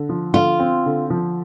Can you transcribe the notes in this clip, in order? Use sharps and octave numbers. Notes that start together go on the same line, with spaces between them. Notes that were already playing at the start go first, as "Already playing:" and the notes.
Already playing: D3
F3
D3 F4
C4
D3
F3